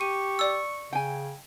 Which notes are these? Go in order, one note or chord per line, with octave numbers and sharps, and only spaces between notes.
G4 C#6 D#7
D5 E6
C#3 G5 G#5